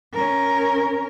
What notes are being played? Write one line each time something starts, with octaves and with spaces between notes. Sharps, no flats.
C#4 A#4